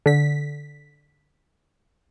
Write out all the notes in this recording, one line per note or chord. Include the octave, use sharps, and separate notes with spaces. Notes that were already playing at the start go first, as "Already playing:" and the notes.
D3 B6